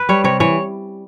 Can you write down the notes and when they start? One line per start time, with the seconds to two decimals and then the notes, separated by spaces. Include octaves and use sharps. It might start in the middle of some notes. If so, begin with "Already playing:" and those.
Already playing: B4
0.09 G3 C#5
0.24 C3 C#5
0.40 E3 C#5